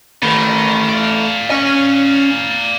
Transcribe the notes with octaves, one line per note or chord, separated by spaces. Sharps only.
D#3 A3 B4
D5 F5
C#4 G#5